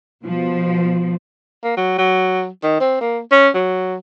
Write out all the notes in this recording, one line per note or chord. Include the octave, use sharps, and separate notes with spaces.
B2 F3
A#3
F#3
F#3
D#3
C4
A#3
C#4
F#3